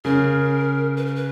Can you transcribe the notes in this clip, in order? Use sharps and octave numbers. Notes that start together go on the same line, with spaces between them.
C#3 A#4
B4
A#4
B4